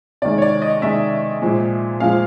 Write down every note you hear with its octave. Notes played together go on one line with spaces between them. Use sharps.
C3 D#3 G#3 D5
C#5
D5
D#5
C3 D#3 G#3 E5
A#2 F3 G#3
A#2 F3 G#3 F5